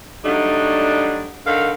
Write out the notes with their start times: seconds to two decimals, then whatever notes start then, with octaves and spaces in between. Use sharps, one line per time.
0.25 F#3 G3 A3 D4 D#4
1.47 D3 D#3 F5